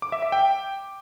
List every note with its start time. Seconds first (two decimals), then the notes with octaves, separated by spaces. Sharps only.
0.02 D6
0.12 E5
0.22 E5
0.32 G5